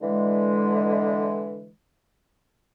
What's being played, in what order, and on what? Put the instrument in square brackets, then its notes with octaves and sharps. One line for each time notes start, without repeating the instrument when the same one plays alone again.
[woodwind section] D3 E3 G#3